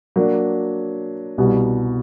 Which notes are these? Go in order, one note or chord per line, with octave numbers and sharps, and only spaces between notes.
F#3 A#3 D4
C2 B2 G3